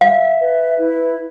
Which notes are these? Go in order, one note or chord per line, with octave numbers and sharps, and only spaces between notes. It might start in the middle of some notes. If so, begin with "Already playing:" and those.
E5 F5
B4
E4